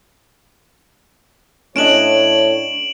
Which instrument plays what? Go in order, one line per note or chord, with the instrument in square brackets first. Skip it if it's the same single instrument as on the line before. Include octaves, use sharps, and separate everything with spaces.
[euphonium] A2 [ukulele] C#4 D4 D#5 [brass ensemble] C#5 [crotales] D7 E7 F#7